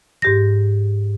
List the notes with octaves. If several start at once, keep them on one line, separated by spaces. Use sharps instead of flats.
G#2 G4 A#6